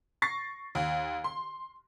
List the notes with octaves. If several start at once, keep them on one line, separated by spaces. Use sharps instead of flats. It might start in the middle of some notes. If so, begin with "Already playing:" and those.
C#6 A6 A#6 C7
D#2
C6